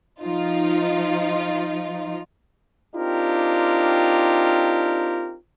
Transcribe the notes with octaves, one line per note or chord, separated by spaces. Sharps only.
F3 D#4 F4
C4 D4 D#4 F4 G4 A#4